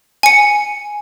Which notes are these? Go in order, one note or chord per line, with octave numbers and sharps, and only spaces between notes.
G#5 C#7